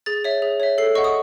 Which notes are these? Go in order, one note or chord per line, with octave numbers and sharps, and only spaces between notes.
G#4 A6
C#5 E5
G#4
C#5 E5
A4 C7
D#5 F#5 C#6
D#6